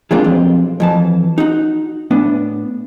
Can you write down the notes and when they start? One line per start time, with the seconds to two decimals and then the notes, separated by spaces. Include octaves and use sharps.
0.11 E3 G#3 A#3 C4 D4 F4
0.24 B1 F2 C4
0.80 F2 E3 A5
1.38 D#4 F#4
2.11 A2 B3 D4